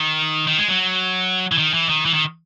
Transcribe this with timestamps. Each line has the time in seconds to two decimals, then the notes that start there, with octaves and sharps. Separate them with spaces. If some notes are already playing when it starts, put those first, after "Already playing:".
Already playing: D#3
0.47 D#3
0.58 G#3
0.68 F#3
1.52 E3
1.58 D#3
1.74 E3
1.89 D#3
2.05 E3
2.14 D#3